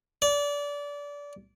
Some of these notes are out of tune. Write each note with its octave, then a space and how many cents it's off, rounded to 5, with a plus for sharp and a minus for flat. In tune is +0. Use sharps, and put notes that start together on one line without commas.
D5 -25